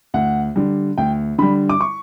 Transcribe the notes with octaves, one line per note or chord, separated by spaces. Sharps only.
D2 F#5
D3 G3
D2 G5
D3 G3 B5
D6
C#6